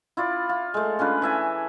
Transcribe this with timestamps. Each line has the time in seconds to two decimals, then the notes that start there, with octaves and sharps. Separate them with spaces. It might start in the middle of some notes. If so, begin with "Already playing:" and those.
0.17 E4 F4 D5
0.49 F4
0.74 G#3 A3
0.99 C#4 D4 F4 B4
1.22 E3 E5 G#5